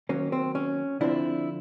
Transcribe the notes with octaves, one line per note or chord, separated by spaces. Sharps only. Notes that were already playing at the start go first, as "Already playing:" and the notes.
D#3 F#3 A#3 C#4
C4
C#4
D3 F3 A3 C4 D4 E4